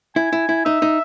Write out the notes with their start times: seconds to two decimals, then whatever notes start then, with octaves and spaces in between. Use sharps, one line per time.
0.16 E4 G#5
0.33 E4
0.49 E4
0.65 D#4 E5
0.82 D#4